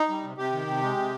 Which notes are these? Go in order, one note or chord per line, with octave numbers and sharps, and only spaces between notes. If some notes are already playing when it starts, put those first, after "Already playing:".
Already playing: D#4
G3
C3
C3 G4
D#3
C3
G#3
C3